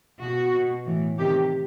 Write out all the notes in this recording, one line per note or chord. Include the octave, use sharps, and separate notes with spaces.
B2 F#4
B2
A2 E3
C3 D#3 G4